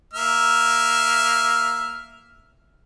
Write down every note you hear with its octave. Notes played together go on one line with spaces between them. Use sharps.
A#3 E5 F6